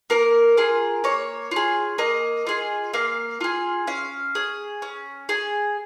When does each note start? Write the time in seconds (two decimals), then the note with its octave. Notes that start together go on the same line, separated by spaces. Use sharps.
0.10 A#3 A#4
0.57 F4 G#4
1.04 A#3 C#5
1.51 F4 G#4
1.98 A#3 D#5
2.47 F4 G#4
2.94 A#3 F5
3.41 F4 G#4
3.87 C#4 F5
4.35 G#4
4.82 C#4
5.29 G#4